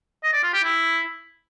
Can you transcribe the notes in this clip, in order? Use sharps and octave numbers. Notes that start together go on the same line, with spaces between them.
D#5
D5
F4
G4
E4